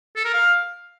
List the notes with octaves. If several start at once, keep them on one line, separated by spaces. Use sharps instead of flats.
A4
A#4
F5